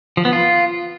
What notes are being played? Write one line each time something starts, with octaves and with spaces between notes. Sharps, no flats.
F3
B3
F4